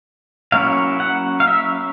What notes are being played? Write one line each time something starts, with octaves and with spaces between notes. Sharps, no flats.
F#3 A#3 C#4 E4 F5
F#5
F5
E5